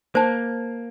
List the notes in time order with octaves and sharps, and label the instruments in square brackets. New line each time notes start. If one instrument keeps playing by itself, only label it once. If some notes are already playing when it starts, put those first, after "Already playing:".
[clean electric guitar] A#3 [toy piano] C5 A5